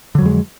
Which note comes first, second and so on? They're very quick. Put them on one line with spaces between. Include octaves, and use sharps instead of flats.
D3 F#3 F2 G#3